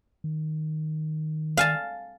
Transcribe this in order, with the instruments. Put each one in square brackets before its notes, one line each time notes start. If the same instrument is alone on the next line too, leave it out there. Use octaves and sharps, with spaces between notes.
[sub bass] D#3
[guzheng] F5 G#5 A5